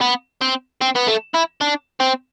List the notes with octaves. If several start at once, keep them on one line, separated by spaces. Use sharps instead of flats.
B3
C4
C4
B3
A3
E4
D4
C4